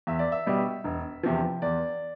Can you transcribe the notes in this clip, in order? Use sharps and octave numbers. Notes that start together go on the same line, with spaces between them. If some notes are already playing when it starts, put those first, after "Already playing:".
E2 E5
D5
E5
B2 G3
E1
E2 C3 F3
E2 D5